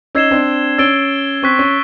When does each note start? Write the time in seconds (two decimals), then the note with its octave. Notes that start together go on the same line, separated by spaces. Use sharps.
0.15 C#4 D#4 E6 G#6 C7 E7 G7
0.31 C4 D4
0.78 C#4 E6 A6 D7 G7
1.43 C4 C#6 F#6 B6
1.59 C#4